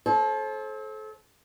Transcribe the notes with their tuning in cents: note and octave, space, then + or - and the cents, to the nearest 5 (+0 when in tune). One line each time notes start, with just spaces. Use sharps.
A4 -30 C5 +35